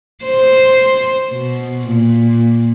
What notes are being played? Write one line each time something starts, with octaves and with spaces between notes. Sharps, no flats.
C5
B2
A#2